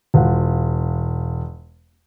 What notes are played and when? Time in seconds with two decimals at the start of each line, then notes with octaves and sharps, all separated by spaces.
0.14 E1 F4 F#5